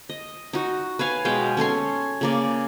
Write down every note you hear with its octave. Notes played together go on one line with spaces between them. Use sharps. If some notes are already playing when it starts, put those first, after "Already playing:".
D#5
D#4 F#4
B4 C#5 F5 G#5
B2 G#3 F5 G5
C#4 A4 C#5 C6
C#3 A#3 D5